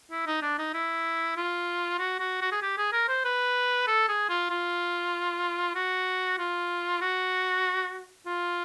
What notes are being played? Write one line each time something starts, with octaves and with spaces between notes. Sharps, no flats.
E4
D#4
D4
D#4
E4
F4
F#4
F#4
F#4
G#4
G4
G#4
A#4
C5
B4
A4
G#4
F4
F4
F#4
F4
F#4
F4